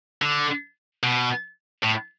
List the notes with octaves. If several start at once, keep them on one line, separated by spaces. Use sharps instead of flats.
D3
B2
A2